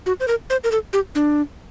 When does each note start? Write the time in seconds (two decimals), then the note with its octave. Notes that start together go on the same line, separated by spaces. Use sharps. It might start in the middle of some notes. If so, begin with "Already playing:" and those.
0.06 F#4
0.20 C5
0.28 A#4
0.50 C5
0.64 A#4
0.72 A4
0.93 G4
1.15 D4